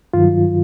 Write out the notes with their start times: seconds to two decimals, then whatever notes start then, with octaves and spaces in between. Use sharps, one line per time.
0.14 G2 D#3 F#3 F4